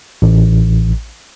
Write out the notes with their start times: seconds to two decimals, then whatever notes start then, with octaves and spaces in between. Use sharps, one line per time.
0.22 A1